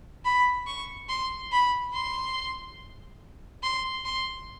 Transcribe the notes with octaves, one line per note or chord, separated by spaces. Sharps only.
B5
C#6
C6
B5
C6
C6
C6